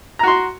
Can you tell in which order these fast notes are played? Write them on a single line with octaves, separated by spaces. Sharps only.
A#5 F#4 C6